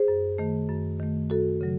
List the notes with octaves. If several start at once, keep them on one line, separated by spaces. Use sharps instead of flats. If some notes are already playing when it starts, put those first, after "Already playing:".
Already playing: G#4 C5
F#2
D#3 A3
F#2
D#3 A3
F#2 F#4 A4
C#3 F#3